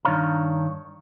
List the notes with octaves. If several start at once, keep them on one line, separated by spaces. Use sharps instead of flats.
G2 D#3 D4 C#5 F5 A#5